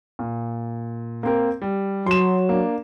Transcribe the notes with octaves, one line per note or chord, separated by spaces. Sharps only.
A#2
A#3 C4 A#4
G3
F#3 C6 E7
A#3 D4